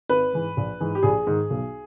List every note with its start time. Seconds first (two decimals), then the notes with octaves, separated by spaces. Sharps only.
0.09 G#1 B4
0.33 G#2 E3
0.57 A#1
0.81 G#2 E3
0.95 G4
1.03 A#1 G#4
1.27 G#2 D#3
1.50 B1